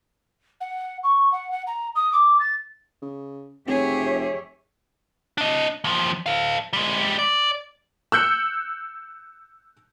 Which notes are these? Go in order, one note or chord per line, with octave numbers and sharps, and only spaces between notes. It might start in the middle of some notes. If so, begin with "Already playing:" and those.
F#5
C#6
F#5
F#5
A#5
D#6
D6
A6
C#3
F1 C4 G4 G#4 C#5 E5
D4 D#5
D#2 F3
A4 F5
G3 G#3
D5
E6 F#6 G6 C#7